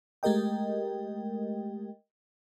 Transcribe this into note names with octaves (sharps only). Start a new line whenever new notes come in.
G#3 A3 G4 A#4 D#5 G5